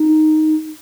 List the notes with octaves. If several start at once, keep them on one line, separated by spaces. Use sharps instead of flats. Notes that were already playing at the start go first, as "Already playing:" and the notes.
Already playing: D#4